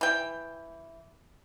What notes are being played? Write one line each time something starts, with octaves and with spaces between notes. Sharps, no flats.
E3 G5